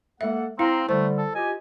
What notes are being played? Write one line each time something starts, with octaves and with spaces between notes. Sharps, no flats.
G#3 A#3 A4 E5 F#5
C4 E4 F5 A#5
D3 G3 A3 C5
A4
F4 G4 D#5 G#5